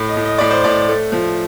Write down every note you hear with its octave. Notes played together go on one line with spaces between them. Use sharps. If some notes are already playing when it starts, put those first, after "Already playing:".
Already playing: A2
D#5
A2
D#5
A2 D5
C5
A2 D5
A3
F3